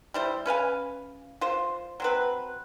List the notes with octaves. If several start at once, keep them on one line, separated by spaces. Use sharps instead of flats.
G3 E4 C5
C#4 B4 F5 G#5
F4 C5
F#3 C4 B4